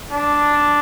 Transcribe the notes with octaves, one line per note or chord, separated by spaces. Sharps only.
D4